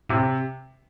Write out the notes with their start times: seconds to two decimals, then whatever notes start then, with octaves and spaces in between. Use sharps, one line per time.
0.09 A2 C3